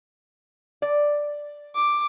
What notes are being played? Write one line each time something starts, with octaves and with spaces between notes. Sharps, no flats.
D5
D6